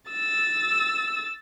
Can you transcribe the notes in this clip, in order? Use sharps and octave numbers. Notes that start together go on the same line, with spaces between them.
E6 A6